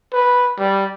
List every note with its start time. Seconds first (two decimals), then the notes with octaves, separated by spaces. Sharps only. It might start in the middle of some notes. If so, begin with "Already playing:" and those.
0.13 B4
0.58 G3